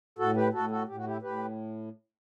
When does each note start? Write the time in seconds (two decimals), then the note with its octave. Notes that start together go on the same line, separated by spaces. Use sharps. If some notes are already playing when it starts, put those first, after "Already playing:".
0.19 A2 F#4 A4
0.36 G4 B4
0.53 A2 F#4 A4
0.71 F#4 A4
0.87 A2 G4
0.96 F#4
1.05 E4 G4
1.22 A2 G4 B4